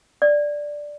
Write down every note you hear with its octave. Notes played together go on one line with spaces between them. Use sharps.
D5